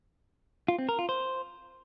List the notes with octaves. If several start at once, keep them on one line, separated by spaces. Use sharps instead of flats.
F4
C4
A#4
F4
C5